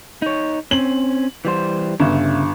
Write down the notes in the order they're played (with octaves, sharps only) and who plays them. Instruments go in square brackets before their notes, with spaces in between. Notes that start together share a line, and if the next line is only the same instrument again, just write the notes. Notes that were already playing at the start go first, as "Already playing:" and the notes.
[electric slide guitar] D#4 C#5
[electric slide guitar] C4 C#4 [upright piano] F#7
[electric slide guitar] E3 G3 C5
[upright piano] G1 [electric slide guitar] C#3 E5